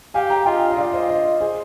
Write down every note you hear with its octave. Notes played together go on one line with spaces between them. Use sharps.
G4 F5 G#5
G5 A#5
F4 D#5 G5
D#5
F4 D5 F5
C5 D#5
C5 D#5
G#4 C5